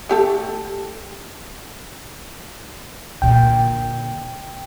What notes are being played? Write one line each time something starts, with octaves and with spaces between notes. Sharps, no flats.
A3 G4 A4
A#2 D3 G5